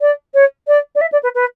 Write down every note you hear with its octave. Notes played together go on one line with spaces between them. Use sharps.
D5
C#5
D5
D5
E5
D5
B4
B4